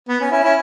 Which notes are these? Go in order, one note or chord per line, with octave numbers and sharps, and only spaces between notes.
B3
C#4
C#4 E4
C#4 E4